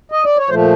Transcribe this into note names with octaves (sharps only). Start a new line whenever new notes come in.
D#5
D5
C#5
A#2 F3 A3 C5